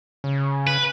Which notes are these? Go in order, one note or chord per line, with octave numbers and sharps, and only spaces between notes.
C#3
B4